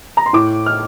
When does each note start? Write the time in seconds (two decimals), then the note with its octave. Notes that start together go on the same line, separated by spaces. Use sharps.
0.17 A#5
0.26 C6
0.33 A2 D6
0.66 F6